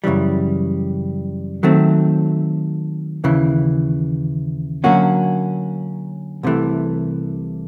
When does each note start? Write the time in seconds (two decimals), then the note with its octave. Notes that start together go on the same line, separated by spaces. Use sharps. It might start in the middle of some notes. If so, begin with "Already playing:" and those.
0.04 F#2 C#3 E3 G3
1.63 D#3 F#3 A3 C4
3.24 D#2 C#3 E3
4.84 D3 F#3 A#3 C#4 F#4
6.43 C2 C3 E3 A3